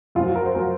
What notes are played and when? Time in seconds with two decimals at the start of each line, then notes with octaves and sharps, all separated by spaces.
0.15 F#2 F4
0.20 F3
0.25 F#4
0.35 A#4
0.45 C5
0.55 F3 A#4